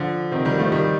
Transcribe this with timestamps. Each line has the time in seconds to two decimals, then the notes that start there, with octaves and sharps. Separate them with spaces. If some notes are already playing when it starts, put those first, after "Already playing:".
Already playing: D3 F3
0.32 C3 D#3
0.45 D#3 G3
0.59 F3 A3
0.72 D#3 G3